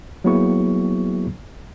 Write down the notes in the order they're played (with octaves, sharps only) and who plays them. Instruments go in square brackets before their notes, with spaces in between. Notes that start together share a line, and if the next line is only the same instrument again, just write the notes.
[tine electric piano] F#3 A#3 B3 E4 G#4 C#6